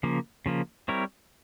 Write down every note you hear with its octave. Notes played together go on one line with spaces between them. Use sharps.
C#3 F3 A#3
C#3 F3 A#3
G3 C4 E4 A#4 C#5